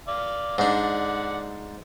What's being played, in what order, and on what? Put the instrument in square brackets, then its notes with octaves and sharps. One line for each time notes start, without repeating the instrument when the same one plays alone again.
[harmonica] D5 F5
[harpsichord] G#2 D4 [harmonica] D5 F#5